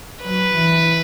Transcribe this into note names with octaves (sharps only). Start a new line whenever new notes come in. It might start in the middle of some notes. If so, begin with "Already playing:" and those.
F#3 B4
E3